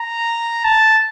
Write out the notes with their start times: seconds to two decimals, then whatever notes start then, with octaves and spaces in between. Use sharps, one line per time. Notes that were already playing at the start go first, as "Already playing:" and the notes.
Already playing: A#5
0.64 A5